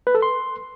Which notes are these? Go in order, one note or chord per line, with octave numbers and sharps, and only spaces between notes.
B4
A4
C6